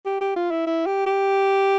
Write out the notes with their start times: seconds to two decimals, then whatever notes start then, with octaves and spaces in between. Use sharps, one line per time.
0.05 G4
0.21 G4
0.36 F4
0.51 E4
0.67 E4
0.86 G4
1.06 G4